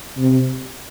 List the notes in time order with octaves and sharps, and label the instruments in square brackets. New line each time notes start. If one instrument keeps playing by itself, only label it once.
[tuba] C3